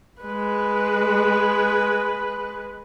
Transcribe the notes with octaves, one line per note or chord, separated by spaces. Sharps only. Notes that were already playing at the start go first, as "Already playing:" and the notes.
G#3 B4